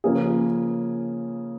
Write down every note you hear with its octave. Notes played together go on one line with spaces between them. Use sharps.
C#3 F3 A#3 C#4 G#4